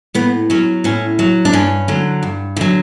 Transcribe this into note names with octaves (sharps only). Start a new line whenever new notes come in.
A2 B3
F#3 C#4
A2 C#4
F#3
D4
G2 C#4
D3 F#3
G2
D3 F#3